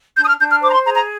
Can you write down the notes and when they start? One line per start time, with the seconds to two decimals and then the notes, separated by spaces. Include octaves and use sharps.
0.17 D4 G6
0.23 D#6
0.28 F6
0.39 D4 G6
0.51 F6
0.62 C5 D6
0.69 A#5
0.74 C6
0.85 G#4 A#5
0.96 A#5